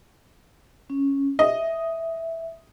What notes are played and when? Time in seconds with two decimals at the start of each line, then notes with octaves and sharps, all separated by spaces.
0.90 C#4
1.39 D#5 E5